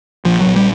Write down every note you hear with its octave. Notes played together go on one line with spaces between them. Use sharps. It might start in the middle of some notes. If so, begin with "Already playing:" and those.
A#1 F3
F#3
A#1
G3